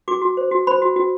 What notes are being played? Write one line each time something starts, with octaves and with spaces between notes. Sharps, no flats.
F#4 D6
F#4
C5
F#4
C5 B5
F#4
F#4